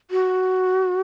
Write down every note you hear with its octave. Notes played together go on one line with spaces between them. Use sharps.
F#4